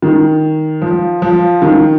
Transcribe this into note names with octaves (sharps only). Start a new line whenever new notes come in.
D#3
F3
F3
D#3